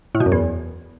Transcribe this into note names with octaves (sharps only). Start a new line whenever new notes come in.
A2
B2
F#2
E2